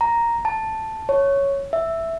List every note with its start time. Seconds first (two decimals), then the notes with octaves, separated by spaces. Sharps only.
0.01 A#5
0.45 A5
1.09 C#5
1.73 E5